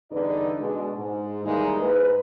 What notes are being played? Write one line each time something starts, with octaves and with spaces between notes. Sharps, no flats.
E2 G2 D3 D#4 B4 D5
B2 G#3 D4
G#2
D#2 E3 G3 G#3 A#3 D#4
G#2 B4